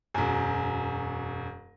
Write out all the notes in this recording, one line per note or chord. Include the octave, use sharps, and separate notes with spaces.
E1 F#2